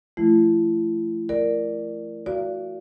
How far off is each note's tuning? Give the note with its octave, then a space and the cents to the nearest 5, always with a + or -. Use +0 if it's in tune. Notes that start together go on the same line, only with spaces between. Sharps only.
F3 -45 A3 +0 E4 +40
A#4 +0 D5 +0
F#4 +0 D5 -20 F5 -35